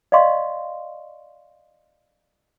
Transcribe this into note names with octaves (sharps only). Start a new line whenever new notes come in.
D5 D#5 F5 C6 C#6